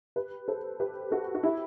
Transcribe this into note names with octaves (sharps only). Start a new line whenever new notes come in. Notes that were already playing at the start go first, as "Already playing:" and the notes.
G4 B4
A4 C5
G4 B4
F#4 A4
F#4
E4 G4